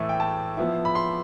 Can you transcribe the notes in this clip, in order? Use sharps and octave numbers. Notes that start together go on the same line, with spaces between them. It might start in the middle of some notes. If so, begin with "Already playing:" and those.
Already playing: A2 E3 A3 E4
G5
A5
F3 B3 E4
B5
C6